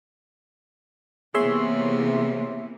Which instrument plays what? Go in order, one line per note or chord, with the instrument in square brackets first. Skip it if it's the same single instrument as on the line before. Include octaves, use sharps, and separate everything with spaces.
[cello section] C3 E3 A#3 [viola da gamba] B3 [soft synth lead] G#4 [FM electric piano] C#5 E5 C6